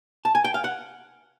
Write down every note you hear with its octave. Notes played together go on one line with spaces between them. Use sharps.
A5
G#5
G5
F5
F#5